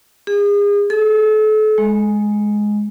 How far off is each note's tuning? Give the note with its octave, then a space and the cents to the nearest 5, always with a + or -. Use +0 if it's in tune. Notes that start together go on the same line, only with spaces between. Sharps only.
G#4 -35
A4 -35
G#3 +5